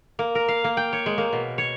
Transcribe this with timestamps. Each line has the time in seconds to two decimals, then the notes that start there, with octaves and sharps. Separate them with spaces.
0.19 A#3
0.35 A#4
0.48 F5
0.64 A#3
0.77 G5
0.93 C#5
1.06 G#3
1.18 A#3
1.33 B2
1.58 C#5